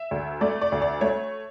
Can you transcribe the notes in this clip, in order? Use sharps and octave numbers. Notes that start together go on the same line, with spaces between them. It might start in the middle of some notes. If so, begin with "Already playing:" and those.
Already playing: E5
D2
A3 D5
D5
D2
D5
A3 C#5